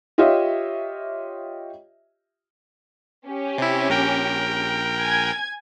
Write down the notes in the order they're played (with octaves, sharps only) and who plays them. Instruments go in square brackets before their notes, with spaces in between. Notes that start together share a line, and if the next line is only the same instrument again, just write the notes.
[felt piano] F4 G4 C#5 D#5 E5
[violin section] C#4 G4
[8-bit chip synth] C3 E4
A#1 A#4 G5
[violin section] G#5 G#6